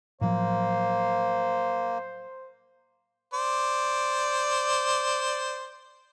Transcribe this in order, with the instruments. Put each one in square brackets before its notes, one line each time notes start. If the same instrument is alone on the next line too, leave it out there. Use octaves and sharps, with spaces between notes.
[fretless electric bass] A2 F3 F#3 [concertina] A#3 [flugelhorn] C5
[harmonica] C5 D5